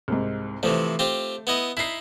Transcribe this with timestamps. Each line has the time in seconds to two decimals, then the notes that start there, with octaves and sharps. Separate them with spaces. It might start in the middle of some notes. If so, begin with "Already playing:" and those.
0.08 C2 G#2
0.63 C3 E3 F3 A3
0.99 C4 F4 G4
1.47 B3 E4 D#5
1.77 D#4 E4 B6 C7